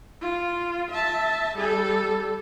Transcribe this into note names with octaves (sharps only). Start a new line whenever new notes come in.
F4
E5 A5
G3 A4